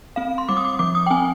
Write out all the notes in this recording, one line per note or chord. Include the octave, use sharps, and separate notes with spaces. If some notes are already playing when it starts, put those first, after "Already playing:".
C4 F5
C6
G3 D6
D#6
D6
F3 D6
D#6
G5
C4 G#5